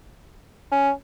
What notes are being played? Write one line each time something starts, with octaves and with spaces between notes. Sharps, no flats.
C#4